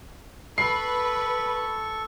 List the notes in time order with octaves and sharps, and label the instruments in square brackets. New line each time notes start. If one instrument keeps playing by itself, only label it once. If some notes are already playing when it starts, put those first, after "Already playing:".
[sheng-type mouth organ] A4 C#6 [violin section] B4 [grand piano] C7